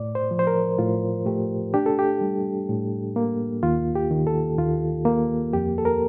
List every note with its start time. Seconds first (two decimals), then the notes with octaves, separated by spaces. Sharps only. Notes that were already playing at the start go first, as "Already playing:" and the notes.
Already playing: A2 D5
0.15 C5
0.31 F3
0.39 C5
0.47 A#4
0.78 A2 F4
1.26 A3 G4
1.74 D4 G4
1.86 A4
1.99 G4
2.21 G3
2.69 A2
3.16 A#3
3.63 D#2 F4
3.95 G4
4.11 D#3
4.27 A4
4.59 D#2 F4
5.05 A#3
5.53 F2 G4
5.78 A4
5.85 A#4